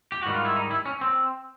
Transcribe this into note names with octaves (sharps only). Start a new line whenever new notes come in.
G4
G#2 D#3 G3 F#4
F4
E4
D#4
E4
C#4
C4